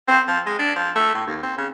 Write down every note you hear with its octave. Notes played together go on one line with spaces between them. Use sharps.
C4
F3
G#3
D4
F3
A3
A2
D#2
C4
C#3